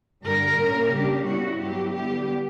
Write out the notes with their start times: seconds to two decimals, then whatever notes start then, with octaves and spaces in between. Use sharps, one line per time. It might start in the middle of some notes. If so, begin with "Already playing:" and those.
0.23 G2 D3 G3 A#4
0.57 A#2 A#3 C#4
0.91 C#3 G3 A#3 D4 G4
1.25 C#3 G3 B3 E4 F#4
1.60 G2 F#3 B3 E4 G4
1.93 D3 G3 B3 G4